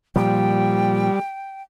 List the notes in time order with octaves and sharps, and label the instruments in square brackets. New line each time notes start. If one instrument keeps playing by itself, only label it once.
[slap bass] A#2 F3 [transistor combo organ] G3 [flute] G5